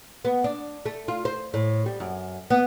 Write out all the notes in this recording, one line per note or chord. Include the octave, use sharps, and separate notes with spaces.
B3
D4
A3
F4
C5
A2
G3
F#2
B3